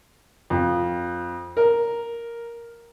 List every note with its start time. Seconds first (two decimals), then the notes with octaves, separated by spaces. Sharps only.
0.50 F2
1.57 A#4